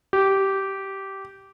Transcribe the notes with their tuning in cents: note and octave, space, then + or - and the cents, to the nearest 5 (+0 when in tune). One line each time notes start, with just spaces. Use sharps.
G4 -15